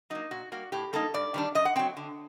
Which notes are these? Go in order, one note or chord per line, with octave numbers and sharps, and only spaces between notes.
F#3 A#3 D#4
A#2 F#4
G3 A#3 F#4
A2 G4
G3 A#3 D#4 A4
G2 D5
D#3 G3 D4
F#2 D#5
F#5
F#3 C4 G5
D3